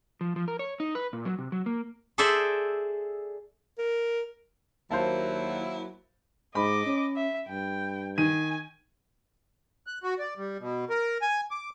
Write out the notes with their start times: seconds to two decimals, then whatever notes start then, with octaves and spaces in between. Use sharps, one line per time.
0.21 F3
0.36 F3
0.48 A#4
0.59 C#5
0.80 D#4
0.95 B4
1.13 A#2
1.25 F#3
1.39 C3
1.52 F#3
1.66 A#3
2.18 G#4 A4 C5 D5 E5
3.78 A#4
4.91 D#2 F#3 A#3 E4 C5 F5 A5
6.55 G#2 D#5 B5 D6
6.86 C#4
7.16 E5
7.48 G2 G5
8.18 D#3 G#5 D#7
9.87 F#6
10.04 F#4
10.19 D5
10.37 G3
10.60 B2
10.90 A#4
11.22 G#5
11.51 D6